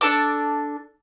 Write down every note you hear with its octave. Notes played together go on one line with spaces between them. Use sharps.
D4 A4 A5 D6